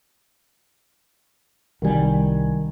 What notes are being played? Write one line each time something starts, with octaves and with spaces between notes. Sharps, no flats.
C2 D#3 G3 G#5